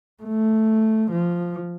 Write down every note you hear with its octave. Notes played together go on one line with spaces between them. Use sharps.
A3
F3